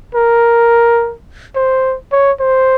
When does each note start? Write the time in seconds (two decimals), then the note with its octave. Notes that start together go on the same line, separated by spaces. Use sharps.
0.15 A#4
1.56 C5
2.12 C#5
2.41 C5